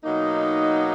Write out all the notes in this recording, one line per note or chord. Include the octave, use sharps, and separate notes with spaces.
B2 F#3 A#3 D#4